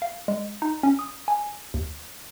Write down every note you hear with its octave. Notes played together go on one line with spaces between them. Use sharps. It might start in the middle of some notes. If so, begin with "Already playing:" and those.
F5
G#3
D#4
C#4
D#6
G#5
D#2